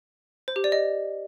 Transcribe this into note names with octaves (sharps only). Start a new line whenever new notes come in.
C5
G4
D5
D#5